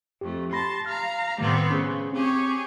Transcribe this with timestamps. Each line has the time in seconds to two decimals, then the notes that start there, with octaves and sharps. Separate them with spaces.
0.21 F2 A3 G4
0.52 G4 A5 B5 C6 A#6
0.86 F5 A#5 F6
1.39 A2 D#3 G3 A3 B3 C4
1.71 C#3 C#4 G#4
2.13 C4 G4 G#4 C#5